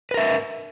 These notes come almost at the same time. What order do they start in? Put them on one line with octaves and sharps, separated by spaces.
B4 A#4 E5